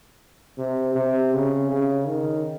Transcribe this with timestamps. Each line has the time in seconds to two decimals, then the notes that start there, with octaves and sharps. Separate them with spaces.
0.58 C3
0.95 C3
1.33 C#3
1.71 C#3
2.07 D#3